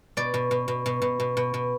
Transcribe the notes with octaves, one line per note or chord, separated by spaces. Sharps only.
B2 D5
B2
B2
B2
B2
B2
B2
B2
B2